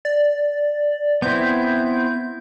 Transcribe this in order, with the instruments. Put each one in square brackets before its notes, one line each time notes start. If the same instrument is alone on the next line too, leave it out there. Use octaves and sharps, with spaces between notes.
[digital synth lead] D5
[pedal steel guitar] B3 C4 E4 [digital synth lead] G6